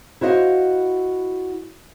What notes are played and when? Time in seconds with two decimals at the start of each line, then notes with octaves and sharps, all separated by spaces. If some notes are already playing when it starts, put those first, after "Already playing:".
0.21 E4 F#4 C5 D#5 F5